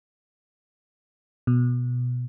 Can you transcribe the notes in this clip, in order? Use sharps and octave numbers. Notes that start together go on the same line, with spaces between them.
B2